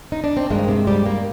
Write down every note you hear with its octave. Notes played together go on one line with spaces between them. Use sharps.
D#4
D4
C4
G2 D#3 G#3 A#3
C3 C4
G3 G4
A#3